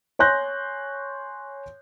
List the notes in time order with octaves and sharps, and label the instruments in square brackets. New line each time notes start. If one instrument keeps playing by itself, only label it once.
[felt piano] C#5 G#5 C6 F#6 G6 A#6